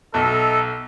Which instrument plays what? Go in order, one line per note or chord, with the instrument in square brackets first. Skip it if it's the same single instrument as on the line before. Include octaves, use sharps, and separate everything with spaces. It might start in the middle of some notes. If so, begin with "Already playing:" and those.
[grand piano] B1 [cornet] A4 [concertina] D#5 E5 A#5